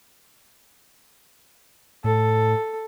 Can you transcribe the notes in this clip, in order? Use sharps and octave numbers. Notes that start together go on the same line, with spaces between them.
A2 A4